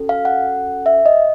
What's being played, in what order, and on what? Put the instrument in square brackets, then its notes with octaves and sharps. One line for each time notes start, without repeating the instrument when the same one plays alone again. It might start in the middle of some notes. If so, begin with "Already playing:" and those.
Already playing: [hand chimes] C#4 F#4 A4
F5
F#5
E5
D#5